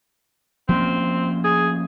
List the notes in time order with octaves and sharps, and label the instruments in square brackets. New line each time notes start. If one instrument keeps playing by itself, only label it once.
[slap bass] F3 A#3 C#4 [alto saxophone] C4
[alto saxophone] G#4